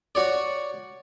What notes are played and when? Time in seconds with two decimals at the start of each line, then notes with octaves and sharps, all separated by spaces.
0.15 F#4 C#5 D5